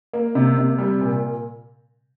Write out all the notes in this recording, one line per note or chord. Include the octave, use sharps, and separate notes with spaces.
A#3
C3
C3
G3
A#2